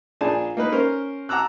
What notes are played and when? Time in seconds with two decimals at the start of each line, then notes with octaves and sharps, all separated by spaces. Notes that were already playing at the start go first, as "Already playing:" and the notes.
0.21 A#1 D4 G#4 G#5 A5
0.57 A#3 D#4 B4
0.72 C#4 A#4 C5
1.29 F#5 A5 A#5 D6 E6 F#6